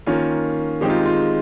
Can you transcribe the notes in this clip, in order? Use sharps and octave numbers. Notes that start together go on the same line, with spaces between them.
D#3 A#3 C#4 F4
D#3 G#3 C4 D#4 G4
F4
F4